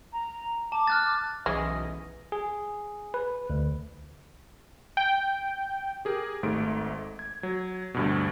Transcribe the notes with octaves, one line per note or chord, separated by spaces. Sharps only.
A#5
A5 D6
F6 F#6 A6
B1 E3 G#3 C#4 D#5
G#4
B4
D2
G5
G4 G#4 A#4
G#1 G#2 A3 D7
G#6
F#3
D2 G2 B2